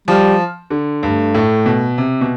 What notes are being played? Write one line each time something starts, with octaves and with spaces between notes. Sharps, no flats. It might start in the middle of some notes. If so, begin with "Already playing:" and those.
F3 G3
D3
G2 A3
A2
B2
C3
B2